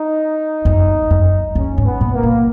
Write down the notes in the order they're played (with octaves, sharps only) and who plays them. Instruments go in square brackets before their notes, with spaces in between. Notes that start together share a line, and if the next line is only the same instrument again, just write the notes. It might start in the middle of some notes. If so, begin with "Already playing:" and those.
Already playing: [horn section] D#4
[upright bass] F#2
F#2
[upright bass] E2 [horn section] C#4
[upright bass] G#2
[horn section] B3
[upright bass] A#2
[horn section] A#3
[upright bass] A#2